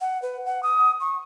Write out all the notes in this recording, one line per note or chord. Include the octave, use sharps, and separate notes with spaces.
F#5
B4
F#5
D#6
C#6